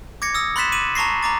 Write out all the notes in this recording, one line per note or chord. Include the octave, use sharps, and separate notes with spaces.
D6 G#6 A#6 C#7
D#6 E6 A#6
B5 C6 F#6 A6 B6 E7
D6 D#7 E7 F#7
A5 A#5 C#6 A#6 C7
A#5 D6 A6